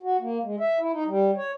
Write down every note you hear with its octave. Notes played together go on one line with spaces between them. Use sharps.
F#4
A#3
G#3
E5
E4
D#4
G3
C#5